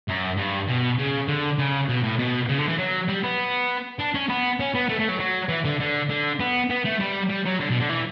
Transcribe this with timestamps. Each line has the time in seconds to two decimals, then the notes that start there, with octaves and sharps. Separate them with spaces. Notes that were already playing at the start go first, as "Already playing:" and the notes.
0.09 F#2
0.38 G2
0.69 B2
0.98 C#3
1.28 D3
1.58 C#3
1.89 B2
2.03 A2
2.19 B2
2.49 C#3
2.58 D3
2.69 E3
2.79 F#3
3.09 G3
3.23 B3
3.99 D4
4.14 C#4
4.29 B3
4.60 C#4
4.74 B3
4.89 A3
4.99 A3
5.09 F#3
5.20 F#3
5.49 E3
5.65 D3
5.80 D3
6.09 D3
6.40 B3
6.70 B3
6.85 A3
6.99 G3
7.30 G3
7.45 F#3
7.60 D3
7.70 B2
7.80 D3
7.90 E3